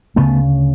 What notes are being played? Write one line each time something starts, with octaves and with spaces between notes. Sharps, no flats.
D2 C#3 A3 B3